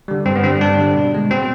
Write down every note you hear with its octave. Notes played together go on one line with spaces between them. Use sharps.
D3 G3
G2 C4
B3
D3 G3 C4
G2 D4
D3 G3
B2
G#3
B2 C4